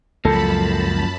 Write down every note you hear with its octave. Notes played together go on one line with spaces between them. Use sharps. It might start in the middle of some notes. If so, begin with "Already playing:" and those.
C#2 F#2 F3 A#3 A4 A5 B5